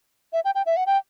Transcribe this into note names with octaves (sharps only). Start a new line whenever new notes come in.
E5
G5
G5
E5
F#5
G5